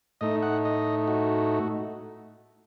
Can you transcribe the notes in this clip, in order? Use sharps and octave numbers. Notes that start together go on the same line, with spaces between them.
A2 A3 D#4 D#5
F#5
D#5
F#4